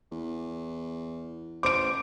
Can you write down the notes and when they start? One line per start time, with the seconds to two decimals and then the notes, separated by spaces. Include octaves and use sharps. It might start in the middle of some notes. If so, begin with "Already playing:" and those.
0.11 E2
1.63 A1 C5 D6 D7